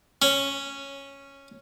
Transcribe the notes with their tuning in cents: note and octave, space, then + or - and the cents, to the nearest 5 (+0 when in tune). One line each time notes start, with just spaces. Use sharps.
C#4 -5